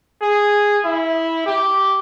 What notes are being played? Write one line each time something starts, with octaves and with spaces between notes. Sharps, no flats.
G#4
E4
G4